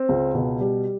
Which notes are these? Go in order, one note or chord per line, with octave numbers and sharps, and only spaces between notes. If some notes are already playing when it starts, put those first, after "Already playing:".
Already playing: C4
C#2
B2
G3